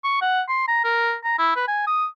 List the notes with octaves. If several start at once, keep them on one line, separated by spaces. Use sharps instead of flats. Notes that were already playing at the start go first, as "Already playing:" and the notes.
C#6
F#5
C6
A#5
A#4
A#5
E4
B4
G#5
D#6